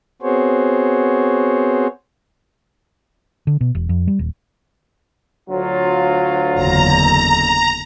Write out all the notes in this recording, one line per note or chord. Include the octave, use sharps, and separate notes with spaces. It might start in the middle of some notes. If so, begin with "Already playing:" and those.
B3 C4 F#4 G#4 C5 C#5
D3
B2
E1
F2
G3
D#1
D2 F#3 F4
F#1 E2 D3 A#5